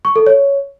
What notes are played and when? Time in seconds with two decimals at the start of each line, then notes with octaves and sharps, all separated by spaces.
0.05 C#6
0.16 A4
0.27 C#5